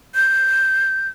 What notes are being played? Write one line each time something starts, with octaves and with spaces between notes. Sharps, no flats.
G6